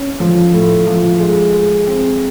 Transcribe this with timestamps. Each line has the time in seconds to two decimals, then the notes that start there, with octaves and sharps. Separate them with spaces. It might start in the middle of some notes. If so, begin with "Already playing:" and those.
Already playing: C#4
0.20 F3
0.53 A2
0.87 F3
1.20 G#3
1.54 G#3
1.87 C4